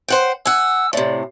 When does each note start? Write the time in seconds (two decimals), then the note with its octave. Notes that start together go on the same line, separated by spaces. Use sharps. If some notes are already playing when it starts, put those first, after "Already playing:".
0.08 C5 F#5 G5
0.45 F#5 G#5 E6
0.93 A2 C3 D5